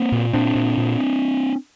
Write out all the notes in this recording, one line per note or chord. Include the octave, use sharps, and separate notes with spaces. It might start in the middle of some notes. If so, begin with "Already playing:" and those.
Already playing: A#3 C4
A#2
A#2 C4 D4
A#2
A#2